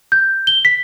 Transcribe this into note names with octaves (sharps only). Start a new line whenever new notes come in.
G6
G7
B6